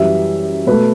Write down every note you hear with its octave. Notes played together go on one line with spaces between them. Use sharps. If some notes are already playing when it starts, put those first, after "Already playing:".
Already playing: F#2 E3 G3 E5
B2 A3 B4